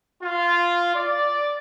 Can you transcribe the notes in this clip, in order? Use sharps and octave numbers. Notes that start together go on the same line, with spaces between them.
F4
D5